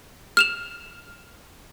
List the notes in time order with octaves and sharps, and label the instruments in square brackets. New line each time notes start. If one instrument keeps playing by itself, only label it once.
[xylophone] F6 E7 F7